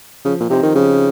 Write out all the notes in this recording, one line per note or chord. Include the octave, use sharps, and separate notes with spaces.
C#3 F3
A#2
C3 C4 D#4 G4 C5
D#3
C#3 F3